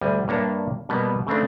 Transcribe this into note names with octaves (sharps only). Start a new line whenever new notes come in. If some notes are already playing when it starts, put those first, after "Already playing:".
D2 G3 G#5
G2 A#3 D4 C#5 E5 A5
B2 G3 A#3 B3
C#3 A3 C4 D4